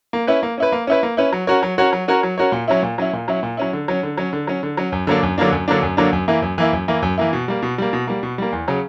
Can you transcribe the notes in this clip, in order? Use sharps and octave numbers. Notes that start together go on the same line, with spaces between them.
A#3
C#4 E4 B4
A#3
C#4 E4 B4
A#3
C#4 E4 B4
A#3
C#4 E4 B4
F#3
C#4 F#4 A#4 C#5
F#3
C#4 F#4 A#4 C#5
F#3
C#4 F#4 A#4 C#5
F#3
C#4 F#4 A#4 C#5
A#2
F#3 C#4 E4
A#2
F#3 C#4 E4
A#2
F#3 C#4 E4
A#2
F#3 C#4 E4
D3
F#3 C#4
D3
F#3 C#4
D3
F#3 C#4
D3
F#3 C#4
F#2
D3 F#3 A#3 D4
F#2
D3 F#3 A#3 D4
F#2
D3 F#3 A#3 D4
F#2
D3 F#3 A#3 D4
F#2
E3 A#3 E4
F#2
E3 A#3 E4
F#2
E3 A#3 E4
F#2
E3 A#3 E4
B2
G3 A#3
B2
G3 A#3
B2
G3 A#3
B2
G3 A#3
E2
C#3 F#3